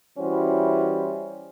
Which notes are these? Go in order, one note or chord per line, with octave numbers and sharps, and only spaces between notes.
E3 G3 C#4 E4 F#4 C5